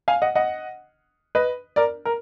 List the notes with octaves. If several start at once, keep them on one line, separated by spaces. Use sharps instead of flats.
F5 G#5
D#5 F#5
D#5 F#5
B4 D#5
A#4 D5
A#4